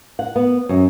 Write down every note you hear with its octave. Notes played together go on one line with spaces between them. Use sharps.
F#5
B3
F#2